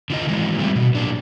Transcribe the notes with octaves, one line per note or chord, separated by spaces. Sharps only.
D3 F4 D#5
D#3 E3 F#3 G#3
G3 A3 C4
B2
A#2 F#3 D4